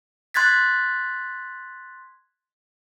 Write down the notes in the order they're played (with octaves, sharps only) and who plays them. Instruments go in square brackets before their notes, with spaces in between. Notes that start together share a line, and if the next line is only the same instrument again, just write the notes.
[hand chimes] C6 F#6 G#6 A6 B6